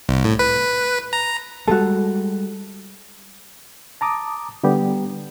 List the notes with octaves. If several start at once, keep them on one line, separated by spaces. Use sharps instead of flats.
C2
A2
B4
A#5
G3 G#3 F#4 A4
A5 A#5 D6 D#6
D3 G3 B3 G4